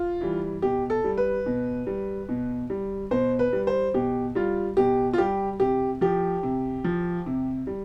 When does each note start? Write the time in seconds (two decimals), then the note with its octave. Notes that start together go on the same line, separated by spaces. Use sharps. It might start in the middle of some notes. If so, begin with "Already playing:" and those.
Already playing: F4
0.21 E3 G3
0.62 B2 G4
0.90 A4
1.04 G3
1.17 B4
1.46 B2
1.87 G3
2.29 B2
2.70 G3
3.11 B2 C5
3.39 B4
3.53 G3
3.67 C5
3.94 B2 G4
4.35 G3 F4
4.77 B2 G4
5.14 F4
5.18 G3 G4
5.60 C3 G4
6.01 F3 G4
6.43 C3
6.84 F3
7.26 C3
7.67 G3